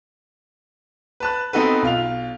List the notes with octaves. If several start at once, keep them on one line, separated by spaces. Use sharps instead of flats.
B4 A5 F#6
B3 C4 D#4 F#4 A4 B4
B1 F4 F7